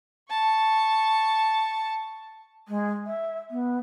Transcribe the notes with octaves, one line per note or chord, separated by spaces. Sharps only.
A5 C#6
G#3
E5
B3